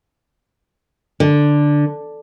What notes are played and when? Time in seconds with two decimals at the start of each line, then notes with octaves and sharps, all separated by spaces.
1.20 D3